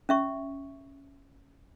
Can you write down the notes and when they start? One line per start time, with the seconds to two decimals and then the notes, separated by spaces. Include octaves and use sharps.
0.09 C#4 E5 C#6